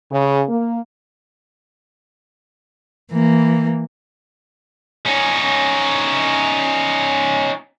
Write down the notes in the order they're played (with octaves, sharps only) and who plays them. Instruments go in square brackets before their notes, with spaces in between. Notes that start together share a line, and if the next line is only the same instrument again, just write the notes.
[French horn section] C#3
A#3
[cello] E3 A#3
[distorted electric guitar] C#4 D#4